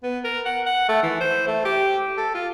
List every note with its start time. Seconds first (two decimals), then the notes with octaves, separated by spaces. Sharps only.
0.03 B3
0.25 A#4
0.45 F#5
0.66 F#5
0.89 A3
1.03 E3
1.21 C5
1.47 A3
1.65 G4
2.17 A4
2.35 F4